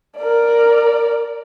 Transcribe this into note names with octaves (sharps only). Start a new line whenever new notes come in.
A#4 D5